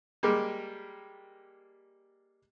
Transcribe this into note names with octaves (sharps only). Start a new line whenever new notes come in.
G3 G#3 A#3 G4